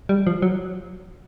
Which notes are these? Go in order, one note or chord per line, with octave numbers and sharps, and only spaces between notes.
G3
F3
F#3